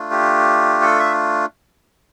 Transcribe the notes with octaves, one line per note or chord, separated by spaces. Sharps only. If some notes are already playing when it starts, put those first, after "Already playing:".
Already playing: A3 D4 F4
G4
A4
E5